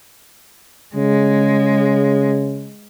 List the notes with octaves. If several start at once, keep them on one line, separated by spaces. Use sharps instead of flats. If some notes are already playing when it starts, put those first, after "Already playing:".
C#3 G#3